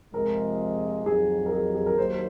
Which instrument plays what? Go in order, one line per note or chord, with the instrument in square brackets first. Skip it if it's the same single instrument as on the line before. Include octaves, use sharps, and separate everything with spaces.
[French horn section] F2 C3 F3 G#3 [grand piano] A#4
[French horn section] F2 D#3 F#3 [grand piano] G#4
[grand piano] A#4
G#4
G#4
A#4
[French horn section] D#2 D#3 F#3 [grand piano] C5